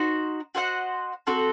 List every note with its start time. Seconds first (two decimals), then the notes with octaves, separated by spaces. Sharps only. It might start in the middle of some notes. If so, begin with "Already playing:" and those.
Already playing: D#4 F#4 C5
0.55 F#4 C5 D#5 F#5
1.27 C4 F#4 A4